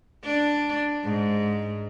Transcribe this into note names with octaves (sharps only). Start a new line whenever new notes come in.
D4
G#2